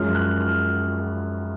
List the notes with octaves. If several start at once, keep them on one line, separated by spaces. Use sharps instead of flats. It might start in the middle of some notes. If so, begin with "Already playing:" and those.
Already playing: F#2 F3 G#3 F6
F#6
F6